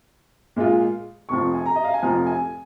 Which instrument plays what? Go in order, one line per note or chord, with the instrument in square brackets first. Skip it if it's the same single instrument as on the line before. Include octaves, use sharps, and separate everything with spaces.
[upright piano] A#2 G#3 F4
F1 F2 F3 C#6
G#5
A#5
D#5
F5
G#5
F1 F2 F3 A#5
G#5